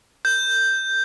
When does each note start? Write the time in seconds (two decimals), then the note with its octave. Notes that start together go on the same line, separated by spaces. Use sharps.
0.25 G6